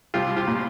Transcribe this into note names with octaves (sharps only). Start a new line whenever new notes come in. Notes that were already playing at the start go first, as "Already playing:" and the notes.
C2 F4 G4
F4 G4
A#2